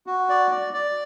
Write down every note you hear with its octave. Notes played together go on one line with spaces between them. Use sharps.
F#4
D5
D5
D5